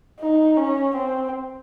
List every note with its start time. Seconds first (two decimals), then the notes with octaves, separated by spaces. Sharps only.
0.20 D#4
0.58 C#4
0.96 C4